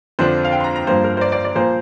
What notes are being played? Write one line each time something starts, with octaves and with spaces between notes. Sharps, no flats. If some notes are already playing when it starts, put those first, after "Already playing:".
F2 D3 F3 D4 C5
F5
G5
C6
A#5
A#5
G2 F3 A#3 C5
A#4
C5
D5
D5
D5
A#2 F3 A#3 C5